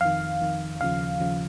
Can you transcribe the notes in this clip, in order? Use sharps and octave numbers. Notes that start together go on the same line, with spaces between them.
F2 D#3 F5
F2 D#3
D#2 C#3 F3 F5
D#2 C#3 F3